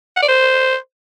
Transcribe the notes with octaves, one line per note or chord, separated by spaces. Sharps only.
F#5
D5
C5